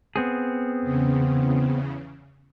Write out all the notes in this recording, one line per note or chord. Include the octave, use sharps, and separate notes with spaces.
B3 C4 G#4
E2 C#3